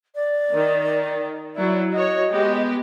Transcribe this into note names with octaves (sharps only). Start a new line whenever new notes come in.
D5
D#3
F#3 E4 D5
F#4 C#5 D#5
G#3 B3 G4